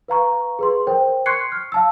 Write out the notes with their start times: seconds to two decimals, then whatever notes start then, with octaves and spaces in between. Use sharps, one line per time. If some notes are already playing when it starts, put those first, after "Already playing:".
0.08 B4 F5 A#5 C#6
0.59 G#4 B4 C6
0.87 A#4 C5 G5
1.26 C6 C#6 F#6 G#6 C7 C#7
1.52 F6
1.72 F5 A5 E6